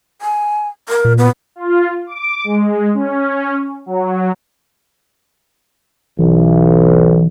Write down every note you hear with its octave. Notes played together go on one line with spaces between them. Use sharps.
G#5
A#4
A#2
B3
F4
D6
G#3
C#4
F#3
B1 E3